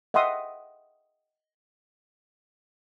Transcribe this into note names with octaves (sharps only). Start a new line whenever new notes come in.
D#5 E5 F#5 G5 C6 D#6